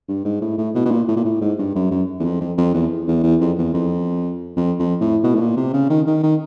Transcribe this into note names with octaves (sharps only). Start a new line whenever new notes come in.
G2
G#2
A2
A2
B2
B2
A#2
A2
A#2
A2
G#2
G2
F#2
F#2
E2
F2
F2
F2
E2
E2
E2
F2
E2
F2
F2
F2
A2
B2
A2
A#2
C3
C#3
D#3
D#3
D#3